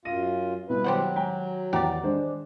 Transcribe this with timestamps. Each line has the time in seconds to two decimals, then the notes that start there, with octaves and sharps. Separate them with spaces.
0.05 F#2 F4 A#6 D#7
0.69 B2 G3 E4 B4
0.84 D#3 F#3 G4 C5 F#5
1.16 G#3 G5 A#5
1.73 E2 D#3 G4 D5 F#5 A#5
2.04 G#3 D4 C5